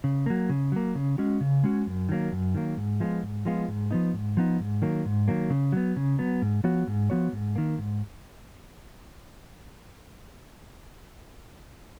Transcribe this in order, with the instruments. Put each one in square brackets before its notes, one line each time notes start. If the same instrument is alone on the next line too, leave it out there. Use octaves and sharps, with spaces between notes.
[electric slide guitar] C#3
F#3 A#3
C#3
F#3 A#3
C#3
G#3 C#4 F#4
C#3
G#3 C#4 F#4
F#2
D#3 F#3 A#3
F#2
D#3 F#3 A#3
G#2
F3 G#3 B3 F4
G#2
F3 G#3 B3 F4
G#2
F3 B3 D#4
G#2
F3 B3 D#4
G#2
D#3 F#3 A#3
G#2
D#3 F#3 A#3
C#3
F#3 B3
C#3
F#3 B3
G#2
F3 B3 F#4 C#5
G#2
F3 B3 F#4 C#5
G#2
D#3 A#3
G#2